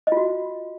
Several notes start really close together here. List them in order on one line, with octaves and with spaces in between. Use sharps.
D#5 F4 F#4